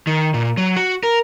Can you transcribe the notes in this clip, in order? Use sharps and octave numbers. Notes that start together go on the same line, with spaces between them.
D#3
A#2
F#3
F#4
A#4